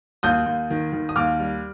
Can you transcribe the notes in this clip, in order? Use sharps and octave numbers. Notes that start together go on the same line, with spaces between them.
D#2 D#6 G6
D#2
D#3
D#3
D#6
D#2 D6 F6
G3